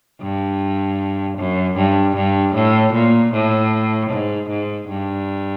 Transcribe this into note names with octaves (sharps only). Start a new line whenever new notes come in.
G2
F#2
G2
G2
A2
A#2
A2
G#2
G#2
G2